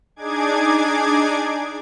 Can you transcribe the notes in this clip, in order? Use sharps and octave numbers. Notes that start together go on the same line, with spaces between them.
D4 D#4 G#4 D6 G#6